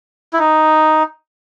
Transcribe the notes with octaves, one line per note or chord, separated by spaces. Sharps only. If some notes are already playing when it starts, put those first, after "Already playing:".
E4
D#4